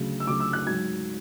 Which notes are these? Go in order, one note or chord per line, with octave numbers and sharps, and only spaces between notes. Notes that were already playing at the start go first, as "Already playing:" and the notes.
Already playing: D2 C#3 F#3
E6
D2 C#3 F#3 D6
E6
F#6
G#2 F#3 G#6